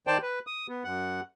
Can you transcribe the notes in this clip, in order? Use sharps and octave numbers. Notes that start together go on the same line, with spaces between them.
D#3 C5 D5 G5 A5
B4
D#6
B3
F#2 F#5